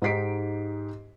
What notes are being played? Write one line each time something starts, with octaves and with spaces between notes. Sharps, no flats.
G#2 D#4 G4 B6 C7 D7